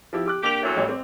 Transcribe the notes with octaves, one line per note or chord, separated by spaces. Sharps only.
F3 E4 G4
G4 D6 F#6
A#3 D4 G4 F7
E2 A2 F#3
A1 G3 C#5
C4